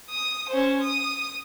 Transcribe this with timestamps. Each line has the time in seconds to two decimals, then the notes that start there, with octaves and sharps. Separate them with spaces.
0.10 D#6
0.49 C#4 C5
0.81 D#6 D#7